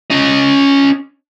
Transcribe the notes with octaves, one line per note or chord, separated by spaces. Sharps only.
C#4 D#5